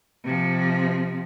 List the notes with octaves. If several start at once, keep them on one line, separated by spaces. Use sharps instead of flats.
C3 F3